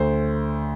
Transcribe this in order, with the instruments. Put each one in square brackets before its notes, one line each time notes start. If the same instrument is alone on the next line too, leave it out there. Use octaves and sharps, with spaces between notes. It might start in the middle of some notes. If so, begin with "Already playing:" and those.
Already playing: [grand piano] D2 C5